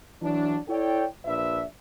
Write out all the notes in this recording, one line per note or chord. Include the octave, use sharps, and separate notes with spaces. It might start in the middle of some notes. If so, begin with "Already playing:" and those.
E3 F#3 D4
E4 A4 C#5 D5 G5
A#1 F3 D4 B4 E5